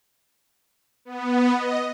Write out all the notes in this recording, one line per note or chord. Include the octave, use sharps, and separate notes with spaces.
B3
D#5